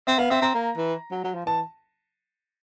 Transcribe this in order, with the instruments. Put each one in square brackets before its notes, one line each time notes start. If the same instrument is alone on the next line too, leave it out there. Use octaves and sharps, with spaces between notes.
[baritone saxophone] C4 [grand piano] E5
[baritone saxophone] B3 [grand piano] F5
[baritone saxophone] C4 [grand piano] E5
[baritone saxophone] C4 [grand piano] A#5
[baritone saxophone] A#3
E3
F#3
F#3
F3
[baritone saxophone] E3 [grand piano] A5